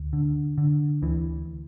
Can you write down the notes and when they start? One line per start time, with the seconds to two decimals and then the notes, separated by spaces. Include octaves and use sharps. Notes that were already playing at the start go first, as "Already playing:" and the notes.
Already playing: D2
0.13 D3
0.58 D3
1.02 D2 E3